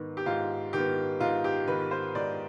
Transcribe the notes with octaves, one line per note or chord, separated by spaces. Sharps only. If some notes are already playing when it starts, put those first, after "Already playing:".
Already playing: G#2 D#3 B3
G4
G#2 F4
D#3 B3 G4
G#2 F4
G4
D#3 B3 B4
C5
G#2 D5